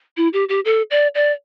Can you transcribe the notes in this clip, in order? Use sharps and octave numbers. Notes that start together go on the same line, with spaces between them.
E4
G4
G4
A4
D5
D5